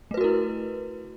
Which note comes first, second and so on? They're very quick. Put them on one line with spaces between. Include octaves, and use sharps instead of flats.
A3 B4 F#4 A#4 E4